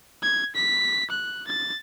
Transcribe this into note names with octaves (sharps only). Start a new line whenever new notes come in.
G#6
B6
F#6
A6